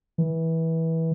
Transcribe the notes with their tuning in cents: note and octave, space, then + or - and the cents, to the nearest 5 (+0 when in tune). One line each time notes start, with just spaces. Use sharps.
E3 -20